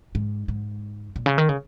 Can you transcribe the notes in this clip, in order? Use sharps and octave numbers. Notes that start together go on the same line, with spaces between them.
G#2
G#2
A#2
C#3
D#3
C#3